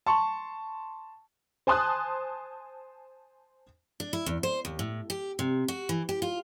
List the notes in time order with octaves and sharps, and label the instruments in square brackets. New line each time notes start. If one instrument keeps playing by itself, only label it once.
[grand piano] A5 C6 C#6
[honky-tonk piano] C5 G#5 A5 C6 D#6 F#6
[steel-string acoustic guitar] D4
E4
E2
C5
D#2
A2
G4
C3
F#4
E3
G4
F4